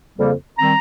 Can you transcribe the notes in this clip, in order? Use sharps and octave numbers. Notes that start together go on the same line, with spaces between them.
F2 C#3 G3 A#3
D#3 G3 C4 A#5